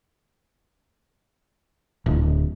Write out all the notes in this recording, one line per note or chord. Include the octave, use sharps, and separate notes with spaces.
D1